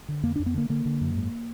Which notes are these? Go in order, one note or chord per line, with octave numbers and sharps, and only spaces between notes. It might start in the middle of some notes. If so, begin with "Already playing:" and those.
D3
F2 A#3
F2 D4
B3
D3 A#3
D3 A#3
D3
F#2
G#2